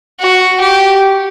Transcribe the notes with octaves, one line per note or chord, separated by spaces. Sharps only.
F#4
G4